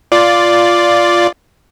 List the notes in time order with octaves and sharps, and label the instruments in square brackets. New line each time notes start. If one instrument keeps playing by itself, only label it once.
[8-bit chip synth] F4 D5